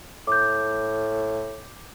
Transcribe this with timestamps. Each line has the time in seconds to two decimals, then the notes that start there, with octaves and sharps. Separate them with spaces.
0.27 A2 D6 G6